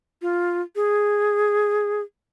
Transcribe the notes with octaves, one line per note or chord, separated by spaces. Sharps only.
F4
G#4